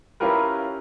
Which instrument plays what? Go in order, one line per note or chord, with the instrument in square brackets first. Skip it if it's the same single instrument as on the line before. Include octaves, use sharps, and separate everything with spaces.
[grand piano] C#4 E4 F4 G4 A#4 B4